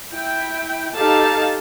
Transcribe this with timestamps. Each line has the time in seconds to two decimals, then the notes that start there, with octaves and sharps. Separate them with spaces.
0.12 E4 G5
0.95 D#4 G4 A4 F5 A5